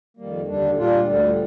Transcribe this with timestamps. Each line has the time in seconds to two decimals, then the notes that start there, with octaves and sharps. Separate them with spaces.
0.17 F2 D#3 G3 A#3
0.47 D#2 D3 G3 D4
0.77 A#2 G3 D4 F4
1.06 D2 D3 G3